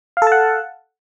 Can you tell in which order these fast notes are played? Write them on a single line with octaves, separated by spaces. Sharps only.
F5 A4 A5 F#5